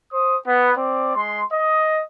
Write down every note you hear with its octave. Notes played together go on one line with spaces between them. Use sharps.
C5 D#6
B3
C4 D5
G#3 C6
D#5